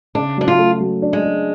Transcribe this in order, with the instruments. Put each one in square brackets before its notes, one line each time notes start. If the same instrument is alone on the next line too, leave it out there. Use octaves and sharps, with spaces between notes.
[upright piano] C#3 [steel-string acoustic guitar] D4
[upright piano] F#3 [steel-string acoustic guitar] D4
[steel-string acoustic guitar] F4
[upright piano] A3
F#3
D4
[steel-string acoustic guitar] G#3
[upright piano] D4